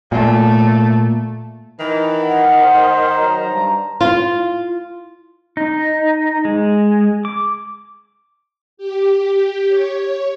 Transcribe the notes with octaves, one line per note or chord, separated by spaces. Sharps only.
A#2 A3
D#3 E3
F#5
C5
F#3 A#5
G2
F4
D#4
G#3
D6
G4
C#5